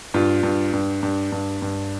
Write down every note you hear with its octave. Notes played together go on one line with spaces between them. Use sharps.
G2 F4
G2
G2
G2
G2
G2